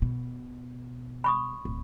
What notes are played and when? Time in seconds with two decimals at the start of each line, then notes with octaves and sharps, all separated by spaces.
0.02 B2
1.24 B5 C#6 D#6
1.65 D1